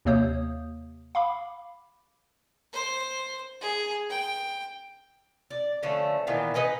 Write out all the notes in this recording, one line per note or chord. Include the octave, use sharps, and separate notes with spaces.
D#2 C3 A#3 C#5 D#6 G6
F5 B5 D6
C5
G#4
G5
D5
D3 F3 A3 C#4
A#2 D#3 E3 B3
D#4 B4 D#5 G#5